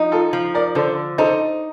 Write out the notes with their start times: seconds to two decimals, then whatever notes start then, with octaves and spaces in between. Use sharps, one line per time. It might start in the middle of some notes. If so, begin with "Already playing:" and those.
Already playing: F3 D#4
0.12 F4 A4
0.33 F3
0.54 A#4 D5
0.75 D3 A4 C5
1.18 D#4 A4 C5